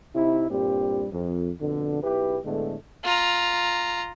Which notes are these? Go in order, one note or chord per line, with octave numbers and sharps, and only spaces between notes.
C3 D#4 E4
G2 A#2 G3 C4 G4
F2
F2 B2 D3
B1 E4 G4 B4
A2 D3 G#3 A3 B3
F4 A#5